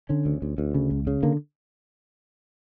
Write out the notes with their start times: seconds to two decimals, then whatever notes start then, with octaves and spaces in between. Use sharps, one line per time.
0.09 D3 C#4
0.26 D2
0.42 D2
0.58 D2
0.74 C#3
0.91 C#2
1.07 C#3
1.23 D3 A#3